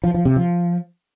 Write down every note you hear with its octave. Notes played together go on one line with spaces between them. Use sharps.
F3
F3
C3
F3